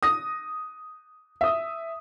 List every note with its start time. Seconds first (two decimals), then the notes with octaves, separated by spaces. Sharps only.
0.03 D#6 A#6
1.41 E5 D#6